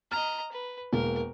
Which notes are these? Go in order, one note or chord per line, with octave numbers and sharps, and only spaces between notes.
D#5 A#5 F6
B4
E1 A#3 A#4